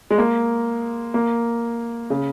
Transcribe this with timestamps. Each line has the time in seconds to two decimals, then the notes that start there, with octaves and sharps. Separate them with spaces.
0.11 G#3
0.18 A#3
1.14 A#3
2.10 C#3